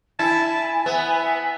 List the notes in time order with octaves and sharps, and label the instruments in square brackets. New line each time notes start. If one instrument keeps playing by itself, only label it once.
[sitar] E4 [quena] G#5 [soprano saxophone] A5
[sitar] B3 [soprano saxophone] E5